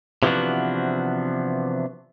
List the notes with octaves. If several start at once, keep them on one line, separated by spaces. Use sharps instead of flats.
C3 E3 F3 B3 D4 F#4